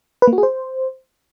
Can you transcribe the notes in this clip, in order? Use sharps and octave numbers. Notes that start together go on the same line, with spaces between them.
B4
A#3
F#4
G#4
C5